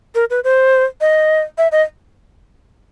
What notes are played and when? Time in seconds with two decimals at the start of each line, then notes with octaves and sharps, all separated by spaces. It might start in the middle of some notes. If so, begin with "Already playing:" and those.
0.15 A#4
0.30 B4
0.44 C5
1.01 D#5
1.58 E5
1.72 D#5